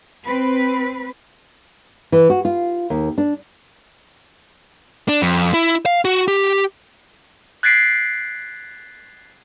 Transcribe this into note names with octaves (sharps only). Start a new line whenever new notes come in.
C4 B4
E3
F#4
F4
D#2
D4
D4
F2
E4
F5
F#4
G4
F#6 G#6 A6 B6 C7 D7